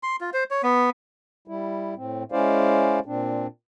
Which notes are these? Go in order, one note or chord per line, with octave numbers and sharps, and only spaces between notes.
C6
F4
C5
C#5
B3
G3 E4
A2 C4
G#3 C#4 E4 C5 D5 F5
A#2 C4 D4